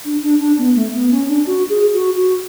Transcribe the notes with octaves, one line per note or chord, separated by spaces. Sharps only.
D4
D4
D4
B3
A3
B3
C#4
D4
F#4
G#4
F#4
F#4